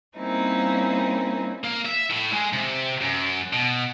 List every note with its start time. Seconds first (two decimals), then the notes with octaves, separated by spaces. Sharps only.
0.17 G3 A#3 C4 C#4 D#4 E4
1.64 A#3
1.86 E5
2.11 A2
2.33 G#3
2.53 C3
3.01 F#2
3.53 B2